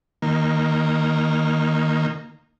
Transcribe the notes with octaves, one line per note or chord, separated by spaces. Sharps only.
D#3 A#3